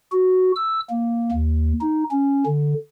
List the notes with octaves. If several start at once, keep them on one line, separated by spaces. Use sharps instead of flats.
F#4
E6
A#3
D#2
D#4
C#4
D3